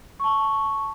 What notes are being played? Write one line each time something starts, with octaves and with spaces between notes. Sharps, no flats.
A5 C#6